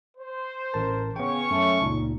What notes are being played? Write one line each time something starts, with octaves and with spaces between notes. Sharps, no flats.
C5
A1 A#4 A5
C#3 B3 C#4 C#5 G5 C#6
F#2 A3
C#2 A#2 D#4